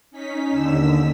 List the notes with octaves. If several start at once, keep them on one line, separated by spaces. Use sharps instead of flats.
C#4 D#4 B6
D#2 D3 E6 B6